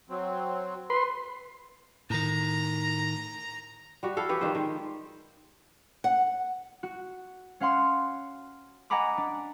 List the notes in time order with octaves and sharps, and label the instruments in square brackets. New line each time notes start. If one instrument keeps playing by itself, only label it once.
[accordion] F#3 C4
[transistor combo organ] B4 C6
[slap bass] A2 D#3 [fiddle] A#5
[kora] G3 F#4
E4 A4 F5
E3 G4 B4 C#5
D#3 G3 F4 C5
D#3 G#3
[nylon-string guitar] F#5
[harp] F#4
C#4 F5 F#5 C6
D#5 F#5 G#5 A#5 B5 D6
D4